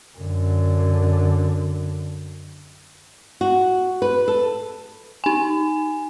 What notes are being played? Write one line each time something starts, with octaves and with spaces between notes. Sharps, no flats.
F#2 D3
F#4
B4
A4
D#4 G#5